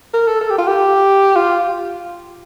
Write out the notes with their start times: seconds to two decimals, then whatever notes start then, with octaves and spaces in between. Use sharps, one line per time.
0.14 A#4
0.27 A4
0.41 A4
0.50 G4
0.58 F4
0.67 G4
1.36 F4